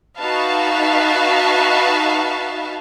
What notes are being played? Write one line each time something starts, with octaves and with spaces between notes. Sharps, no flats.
D#4 F#4 B4 E5 F5 A5